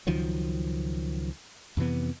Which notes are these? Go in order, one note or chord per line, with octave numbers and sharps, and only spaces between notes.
C#2 D#3 F3 F#3
F2 C3 E3 B3